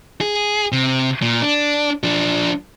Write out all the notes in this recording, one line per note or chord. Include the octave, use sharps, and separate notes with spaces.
G#4
C3
A#2
D4
F3 D4